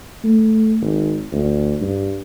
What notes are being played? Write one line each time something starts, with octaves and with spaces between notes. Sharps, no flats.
A3
G#1
D2
G2